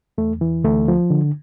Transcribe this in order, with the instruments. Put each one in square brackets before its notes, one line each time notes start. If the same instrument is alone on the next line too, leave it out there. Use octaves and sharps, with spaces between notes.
[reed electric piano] E2 A3
E3
D2 A3
F3
D3